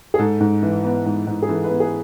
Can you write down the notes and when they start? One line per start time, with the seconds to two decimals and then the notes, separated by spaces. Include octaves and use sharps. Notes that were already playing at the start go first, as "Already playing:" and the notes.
0.14 G#4
0.19 G#2 A4
0.40 G#2
0.62 E3
0.84 B3
1.06 G#2
1.27 G#2
1.42 G#4
1.48 E3 A4
1.64 B4
1.70 B3
1.80 G#4